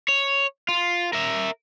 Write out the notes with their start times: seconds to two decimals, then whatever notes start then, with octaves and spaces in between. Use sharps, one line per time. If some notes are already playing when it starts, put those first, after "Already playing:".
0.08 C#5
0.69 F4
1.13 A#4 E5